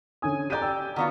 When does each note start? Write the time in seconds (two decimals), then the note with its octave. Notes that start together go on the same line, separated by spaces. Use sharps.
0.22 D3 C#4 G#5 D#6
0.50 G4 D5 A#5 G6 D#7
0.62 G5 E6
0.96 D#3 B3 F4 F#4